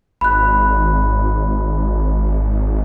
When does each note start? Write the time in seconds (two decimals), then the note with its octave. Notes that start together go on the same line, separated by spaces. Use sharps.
0.21 G#1 B5 F#6